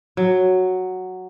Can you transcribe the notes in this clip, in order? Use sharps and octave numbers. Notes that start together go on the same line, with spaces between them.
F#3